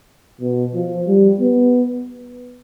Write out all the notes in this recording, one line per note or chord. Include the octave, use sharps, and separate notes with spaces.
B2
F3
G3
B3